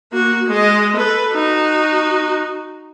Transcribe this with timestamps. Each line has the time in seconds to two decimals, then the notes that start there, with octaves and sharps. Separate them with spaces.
0.12 A#3 F#4
0.47 G#3 D#5
0.96 A4 B4
1.33 D#4 F#4